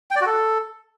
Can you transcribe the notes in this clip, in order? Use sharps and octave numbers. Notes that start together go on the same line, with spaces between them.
G5
D5
F#4
A4